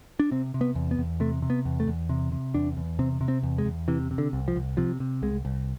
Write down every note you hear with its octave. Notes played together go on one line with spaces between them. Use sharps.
D4
C3 C4
C3
B3
E2
B3
E2
C3 A3
C3
B3
E2
A3
E2
C3
C3
E2 D4
E2
C3 C4
C3
C4
E2
G#3
E2
C3 E3
C3
D3
C2
F3
C2
C3 F3
C3
C2 G#3
C2